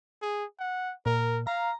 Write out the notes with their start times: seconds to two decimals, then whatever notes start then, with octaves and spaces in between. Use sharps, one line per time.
0.22 G#4
0.59 F#5
1.06 A#2 A#4
1.47 F5 A#5